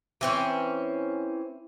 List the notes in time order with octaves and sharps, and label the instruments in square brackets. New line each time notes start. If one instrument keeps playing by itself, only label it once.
[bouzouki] E3 C4 C#4